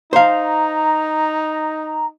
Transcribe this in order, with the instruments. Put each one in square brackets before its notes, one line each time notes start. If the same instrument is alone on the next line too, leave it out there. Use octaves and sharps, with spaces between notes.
[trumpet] D#4 [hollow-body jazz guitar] C5 F5 [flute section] A#5